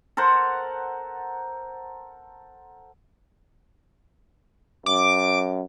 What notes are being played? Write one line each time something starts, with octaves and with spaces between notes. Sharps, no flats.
A4 A#4 C5 F#5
F#2 D6